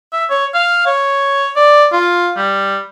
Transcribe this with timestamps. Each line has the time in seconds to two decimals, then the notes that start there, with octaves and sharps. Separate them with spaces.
0.13 E5
0.30 C#5
0.54 F5
0.86 C#5
1.56 D5
1.93 F4
2.37 G3